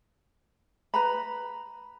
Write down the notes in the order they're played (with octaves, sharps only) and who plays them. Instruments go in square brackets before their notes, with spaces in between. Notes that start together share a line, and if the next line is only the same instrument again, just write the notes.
[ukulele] B4 A#5 B5